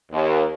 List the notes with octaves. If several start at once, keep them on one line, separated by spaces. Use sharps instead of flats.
D#2